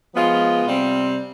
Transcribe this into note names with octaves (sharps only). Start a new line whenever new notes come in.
F3 G#3 B3 F4
C3 G3 C4